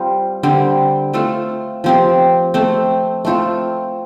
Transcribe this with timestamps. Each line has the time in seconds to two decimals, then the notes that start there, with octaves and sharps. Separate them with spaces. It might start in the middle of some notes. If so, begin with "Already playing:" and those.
Already playing: G3 C4 F4
0.43 D3 G3 C4
1.13 A3 C4 F4 A4
1.84 F3 C4 G4
2.54 A3 C4 A4
3.25 A3 C4 F4 A4